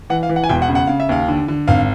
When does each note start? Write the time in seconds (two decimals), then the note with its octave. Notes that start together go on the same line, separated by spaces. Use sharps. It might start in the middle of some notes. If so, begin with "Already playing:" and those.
0.10 E3 F#5
0.23 F5
0.29 E3
0.36 F#5
0.44 G#5
0.49 E1 G5
0.62 F#5
0.69 C#3
0.75 F#5
0.87 C#3 F5
1.00 E5
1.09 D#2 F5
1.28 D3
1.48 D3
1.68 G#1 F5